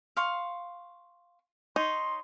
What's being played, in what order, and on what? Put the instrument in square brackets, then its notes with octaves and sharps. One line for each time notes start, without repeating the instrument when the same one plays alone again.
[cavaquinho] F5 C6 C#6
[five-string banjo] D#4 [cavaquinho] C#5 [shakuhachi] C6